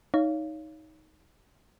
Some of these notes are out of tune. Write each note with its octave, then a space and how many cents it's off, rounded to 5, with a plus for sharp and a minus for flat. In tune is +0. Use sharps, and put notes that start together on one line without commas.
D#4 +10 C#5 +25 F5 -20